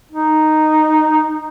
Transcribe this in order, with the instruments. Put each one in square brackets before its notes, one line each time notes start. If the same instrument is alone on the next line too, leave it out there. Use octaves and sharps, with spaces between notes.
[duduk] D#4